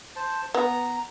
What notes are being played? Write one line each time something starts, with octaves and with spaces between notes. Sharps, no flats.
C5 A5
B3 A#5